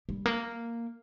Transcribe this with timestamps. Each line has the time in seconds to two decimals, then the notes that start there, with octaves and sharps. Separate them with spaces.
0.09 G3
0.26 A#3